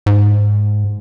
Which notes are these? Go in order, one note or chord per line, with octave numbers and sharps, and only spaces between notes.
G#2